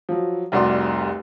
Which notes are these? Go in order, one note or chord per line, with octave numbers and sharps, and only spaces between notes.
F3 F#3
F1 C2 F#4 D5 C6